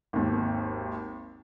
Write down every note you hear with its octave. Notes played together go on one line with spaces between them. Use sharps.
G#1 D#2